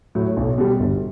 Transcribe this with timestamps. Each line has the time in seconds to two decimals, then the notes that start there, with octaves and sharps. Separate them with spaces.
0.15 A2 F#3
0.37 B1
0.58 B2 G3
0.80 G1